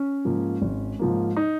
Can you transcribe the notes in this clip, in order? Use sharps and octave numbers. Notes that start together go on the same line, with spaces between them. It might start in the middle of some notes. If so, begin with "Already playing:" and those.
Already playing: C#4
G#2 F3 A#3
G#1
G#2 F3 A#3
D#4